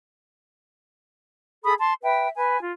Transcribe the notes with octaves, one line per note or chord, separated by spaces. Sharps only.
G#4 A4 B5 D#6
A5 C6
B4 E5 G5
B4 G#5
F4